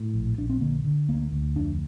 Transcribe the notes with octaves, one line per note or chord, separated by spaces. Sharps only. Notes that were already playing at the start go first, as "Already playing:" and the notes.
Already playing: A2
A#1
A#1 D4
C4
D3 A#3
D3
D2 A#3
D2
F2 D4